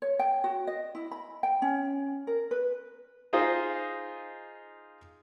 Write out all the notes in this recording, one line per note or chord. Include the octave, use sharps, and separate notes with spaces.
C#5
G5
F#4
D#5
E4
B5
G5
C#4
A#4
B4
D#4 F4 G#4 C5 D#5